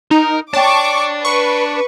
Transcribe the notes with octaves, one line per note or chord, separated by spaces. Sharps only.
D#4 A#4
D4 C#5 G5 A5 C#6 D6
B4 C#6